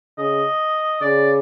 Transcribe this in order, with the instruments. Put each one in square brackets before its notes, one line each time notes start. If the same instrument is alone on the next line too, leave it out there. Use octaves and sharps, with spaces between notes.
[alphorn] C#3 [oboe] D#5
[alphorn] C#3 [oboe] D5